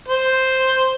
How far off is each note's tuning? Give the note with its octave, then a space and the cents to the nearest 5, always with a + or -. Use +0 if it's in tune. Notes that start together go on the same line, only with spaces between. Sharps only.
C5 +0